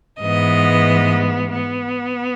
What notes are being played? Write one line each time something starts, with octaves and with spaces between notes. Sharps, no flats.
G#2 E3 G#3 B3 D#5
B3